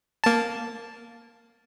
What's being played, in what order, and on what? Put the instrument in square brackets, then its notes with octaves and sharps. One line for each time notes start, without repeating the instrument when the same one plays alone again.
[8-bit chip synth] A#3 A5